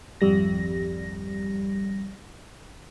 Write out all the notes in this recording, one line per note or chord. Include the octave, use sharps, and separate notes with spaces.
G#1 F2 G3 A#6